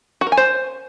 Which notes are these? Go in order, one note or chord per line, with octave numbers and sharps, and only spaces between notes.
F#4
A#4
G#5
C5